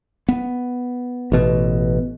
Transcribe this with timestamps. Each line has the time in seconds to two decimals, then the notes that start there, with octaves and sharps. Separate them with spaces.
0.28 B3
1.32 A1 B2